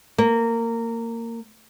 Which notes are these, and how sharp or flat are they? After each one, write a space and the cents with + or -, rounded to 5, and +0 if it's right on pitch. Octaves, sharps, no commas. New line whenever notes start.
A#3 -20